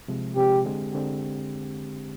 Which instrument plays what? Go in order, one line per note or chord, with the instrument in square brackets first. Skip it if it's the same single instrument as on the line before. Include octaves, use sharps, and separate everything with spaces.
[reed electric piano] C3 F3 G#3
[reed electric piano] C3 F3 G#3 [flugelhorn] G4
[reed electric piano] D3 G#3 C4 G4
D3 G#3 C4 G4